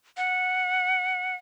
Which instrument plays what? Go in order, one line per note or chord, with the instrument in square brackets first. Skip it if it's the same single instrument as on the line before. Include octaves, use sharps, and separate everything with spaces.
[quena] F#5